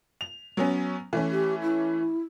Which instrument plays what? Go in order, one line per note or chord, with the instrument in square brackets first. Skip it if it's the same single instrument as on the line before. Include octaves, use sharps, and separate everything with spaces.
[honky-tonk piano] F7
F#3 B3 C#4
E3 A3 C#4
[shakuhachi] G4
E4